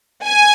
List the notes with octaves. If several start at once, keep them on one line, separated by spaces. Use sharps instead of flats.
G#5